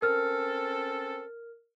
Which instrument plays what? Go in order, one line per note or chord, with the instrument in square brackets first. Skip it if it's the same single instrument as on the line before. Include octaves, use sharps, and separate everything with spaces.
[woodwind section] C4 C#4 A4 [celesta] A#4 F6